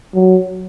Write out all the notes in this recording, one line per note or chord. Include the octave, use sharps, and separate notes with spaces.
F#3